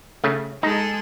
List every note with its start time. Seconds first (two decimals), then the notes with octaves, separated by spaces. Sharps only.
0.24 C#3 A3
0.63 G#3 D#4 G#4 A4